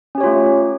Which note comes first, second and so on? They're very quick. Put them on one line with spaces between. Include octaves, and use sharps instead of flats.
C#4 G4 C#5 F4 A3